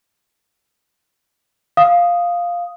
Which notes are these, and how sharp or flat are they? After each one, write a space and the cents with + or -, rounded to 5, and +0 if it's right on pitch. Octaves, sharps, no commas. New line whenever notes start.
F5 +0 D#6 +0